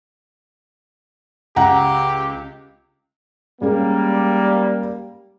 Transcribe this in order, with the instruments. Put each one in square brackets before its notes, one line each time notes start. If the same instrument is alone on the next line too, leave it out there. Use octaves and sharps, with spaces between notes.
[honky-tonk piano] C#2 [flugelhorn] G4 [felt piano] F#5 A#5
[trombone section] G3 A#3 [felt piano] G#3 C#4 G#4